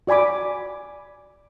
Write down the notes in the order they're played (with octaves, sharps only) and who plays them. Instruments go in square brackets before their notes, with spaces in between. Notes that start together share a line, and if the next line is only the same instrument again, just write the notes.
[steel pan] F#4 D5 G#5 B5 D6